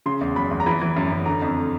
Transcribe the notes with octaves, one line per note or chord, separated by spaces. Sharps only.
C#3 C6
E2
F#1 B5
E2
A#5
E3 B5
E3
F#2
F#2
D3 A#5
F2